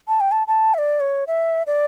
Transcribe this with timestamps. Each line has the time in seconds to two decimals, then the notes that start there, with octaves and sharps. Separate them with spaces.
0.08 A5
0.20 G5
0.32 A5
0.47 A5
0.74 E5
0.78 D5
1.00 C#5
1.27 E5
1.67 D5